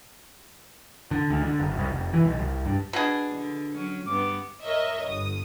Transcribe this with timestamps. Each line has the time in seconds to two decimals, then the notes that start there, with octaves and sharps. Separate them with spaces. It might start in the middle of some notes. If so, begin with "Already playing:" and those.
1.11 D3
1.30 D2
1.43 D3
1.60 F#1
1.77 C2
1.90 F1
2.13 E3
2.25 B1
2.39 C2
2.66 G2
2.93 B2 D4 G#4
3.35 D3
3.73 F#3 C#4
4.07 G2 B3 D6
4.61 A#4 C#5 D#5 E5
5.07 G1 D#6